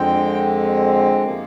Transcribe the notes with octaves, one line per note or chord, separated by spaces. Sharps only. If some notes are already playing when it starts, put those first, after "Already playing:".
Already playing: F2 D3 G#3 C4 G5
C3 F3 A#3